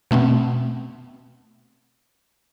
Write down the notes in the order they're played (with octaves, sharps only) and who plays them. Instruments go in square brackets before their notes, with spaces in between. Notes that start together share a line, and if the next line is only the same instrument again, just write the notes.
[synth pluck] B2 A3 B3 C4